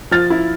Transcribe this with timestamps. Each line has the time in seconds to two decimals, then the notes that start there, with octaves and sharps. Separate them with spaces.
0.11 F3 F6 A6
0.30 E4